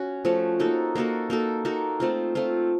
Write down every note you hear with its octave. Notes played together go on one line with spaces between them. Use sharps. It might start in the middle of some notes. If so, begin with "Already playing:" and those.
Already playing: C#4 F#4
F3 A3 C#4 F#4
A#3 D#4 F#4 A4
A#3 D#4 F#4 A4
A#3 D#4 F#4 A4
A#3 D#4 F#4 A4
A3 C4 F4
A3 C4 F4